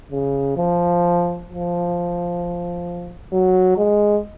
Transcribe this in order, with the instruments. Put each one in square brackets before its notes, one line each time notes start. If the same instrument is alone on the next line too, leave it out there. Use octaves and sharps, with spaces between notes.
[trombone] C#3
F3
F3
F#3
G#3